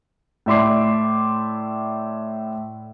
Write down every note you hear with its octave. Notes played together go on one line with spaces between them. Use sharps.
A2 D5 E5 C6 D6 C7